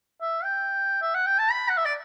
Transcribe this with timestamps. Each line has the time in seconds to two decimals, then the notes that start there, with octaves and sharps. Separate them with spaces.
0.21 E5
0.44 G5
1.02 E5
1.15 F#5
1.26 G5
1.39 A5
1.51 B5
1.69 F#5
1.77 E5
1.85 D5